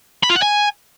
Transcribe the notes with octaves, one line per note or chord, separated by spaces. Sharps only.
B5
F4
F#5
G#5